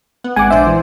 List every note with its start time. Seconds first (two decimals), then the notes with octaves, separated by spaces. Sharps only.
0.24 B3
0.36 G#1 G#3 F#5 G#5 D6
0.50 A#1 D4 C5 D5 E5
0.67 E3